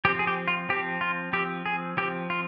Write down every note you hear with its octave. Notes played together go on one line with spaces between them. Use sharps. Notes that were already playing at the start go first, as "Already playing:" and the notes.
F3 C4 G4
G#4
G4
F4
F3 C4 G4
F4
F3 C4 G4
G#4
F3 C4 G4
F4